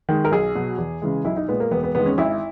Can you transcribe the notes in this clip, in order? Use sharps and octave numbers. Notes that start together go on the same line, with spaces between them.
D#3 G#3
A#4
B1 G#4
B2 F#3
E2
C#3 E3 G#3
B1 E4
D#4
A#2 G#3 B3
A#3
E1 B3
B3
E2 D#3 G#3 B3
C#4
G#1 E4